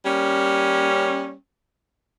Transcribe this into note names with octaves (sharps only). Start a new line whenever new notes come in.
G3 A#3 C#4